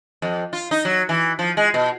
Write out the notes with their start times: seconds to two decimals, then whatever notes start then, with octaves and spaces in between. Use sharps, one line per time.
0.22 F2
0.53 F4
0.71 D#4
0.85 F#3
1.09 E3
1.39 F3
1.57 G#3
1.74 B2